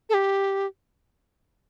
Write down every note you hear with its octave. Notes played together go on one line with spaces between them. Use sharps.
A4
G4